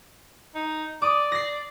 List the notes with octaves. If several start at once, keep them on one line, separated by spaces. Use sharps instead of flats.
D#4
D5 D6 D#6
A#6 C7